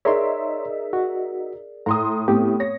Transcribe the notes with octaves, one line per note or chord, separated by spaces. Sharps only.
D#4 G#4 A#4 C#5 D5 E5 A#5 C6
F#4
A2 A#5 C6 D#6
A2 A3 B3 C4 G4
C#5 A#6